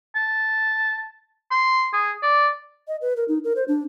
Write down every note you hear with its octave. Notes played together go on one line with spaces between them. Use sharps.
A5
C6
G#4
D5
D#5
B4
A#4
D#4
A#4
C5
D4